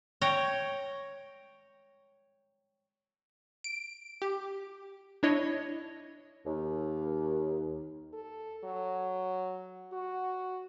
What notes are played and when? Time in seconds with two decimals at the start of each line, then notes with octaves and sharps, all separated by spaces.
0.21 C#5 G5 A#5
3.64 D7
4.22 G4
5.23 D4 E4 C#5 D#5
6.45 D#2
8.13 A4
8.64 F#3
9.92 F#4